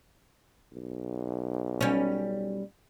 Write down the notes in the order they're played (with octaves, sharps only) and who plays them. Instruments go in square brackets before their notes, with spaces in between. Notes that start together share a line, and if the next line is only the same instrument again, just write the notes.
[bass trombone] B1
[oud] G3 C#4